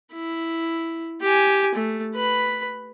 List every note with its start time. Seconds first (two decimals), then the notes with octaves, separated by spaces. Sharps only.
0.13 E4
1.21 G4 G#5
1.75 A3
2.14 B4 B5